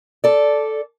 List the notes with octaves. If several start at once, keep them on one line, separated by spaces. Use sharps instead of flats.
A4 D5